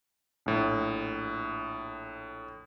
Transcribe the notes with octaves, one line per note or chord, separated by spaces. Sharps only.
A#1 A2